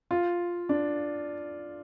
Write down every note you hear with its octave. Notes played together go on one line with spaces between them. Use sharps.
F4
D4